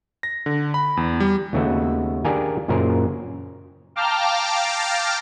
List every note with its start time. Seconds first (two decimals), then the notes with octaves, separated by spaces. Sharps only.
0.23 A#6
0.46 D3
0.74 B5
0.97 E2
1.20 G3
1.53 D#2 C#3 A3 B3 F#4 E5
2.25 D4 G4 G#4 A#4 F5 G#5
2.68 F#2 A#2 C#3 G#4 A#4 C5
3.96 F5 G5 A5 A#5 D6 F6